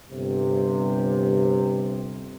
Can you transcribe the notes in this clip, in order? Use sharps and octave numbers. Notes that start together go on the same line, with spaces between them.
G1 G2 C3